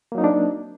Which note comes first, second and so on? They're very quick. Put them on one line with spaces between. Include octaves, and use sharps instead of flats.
A#3 F#3 D#4 C4 D4